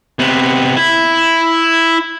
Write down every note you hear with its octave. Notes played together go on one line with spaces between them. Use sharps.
C3 B3
E4